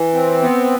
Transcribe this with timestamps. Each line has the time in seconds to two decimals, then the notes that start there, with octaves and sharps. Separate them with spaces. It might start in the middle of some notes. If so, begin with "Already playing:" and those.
Already playing: E3
0.14 C4
0.42 B3